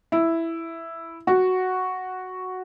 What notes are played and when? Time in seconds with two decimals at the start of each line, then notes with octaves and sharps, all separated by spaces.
0.12 E4
1.27 F#4